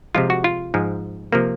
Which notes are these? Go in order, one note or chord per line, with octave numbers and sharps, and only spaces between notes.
C3 F3 G#3 F4
F#4
F4
G#2 F3 G#3
C3 F3 A#3